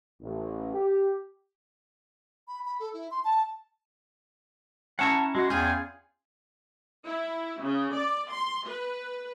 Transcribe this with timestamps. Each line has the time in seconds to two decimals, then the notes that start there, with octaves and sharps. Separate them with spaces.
0.21 A1
0.74 G4
2.48 B5
2.66 B5
2.80 A4
2.93 E4
3.11 C6
3.24 A5
4.99 C#4 E4 F#5 A5 A#5 C#6
5.35 G#3 F#4
5.50 E2 F4 G#4 G5 G#5
7.06 E4
7.62 C#3
7.95 D5
8.31 C6
8.67 B4